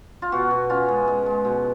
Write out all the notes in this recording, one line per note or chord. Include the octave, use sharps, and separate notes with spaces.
F4
B2 F#4
B2
C#4 F4
G#3
G#3
G#3
B2